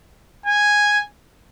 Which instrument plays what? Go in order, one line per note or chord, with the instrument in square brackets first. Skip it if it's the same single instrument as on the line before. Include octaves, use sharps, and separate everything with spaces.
[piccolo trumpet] G#5